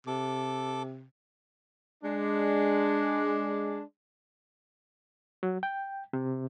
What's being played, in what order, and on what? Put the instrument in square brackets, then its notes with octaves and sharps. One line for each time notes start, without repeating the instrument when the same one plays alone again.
[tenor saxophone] C3 [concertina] A4 D6
[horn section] G#3 D4
[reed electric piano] F#3
G5
C3